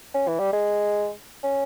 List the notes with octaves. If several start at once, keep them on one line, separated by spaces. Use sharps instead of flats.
C#4
E3
G3
G#3
C#4